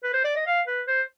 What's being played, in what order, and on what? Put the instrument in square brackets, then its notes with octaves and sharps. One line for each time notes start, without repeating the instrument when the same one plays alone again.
[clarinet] B4
C5
D5
D#5
F5
B4
C5